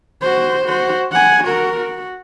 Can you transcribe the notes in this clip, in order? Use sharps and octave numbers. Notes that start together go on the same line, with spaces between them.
F#4 C5
F#4 C5
F#5 G#5
F#4 A#4
F#4